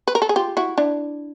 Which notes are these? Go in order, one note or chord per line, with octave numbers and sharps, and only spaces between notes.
B4
A#4
A4
G#4
F4 G4
E4 F#4
D4 E4